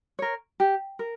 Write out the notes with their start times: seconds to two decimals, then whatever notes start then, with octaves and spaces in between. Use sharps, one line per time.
0.19 A#4 C#5
0.60 G4
0.99 A#4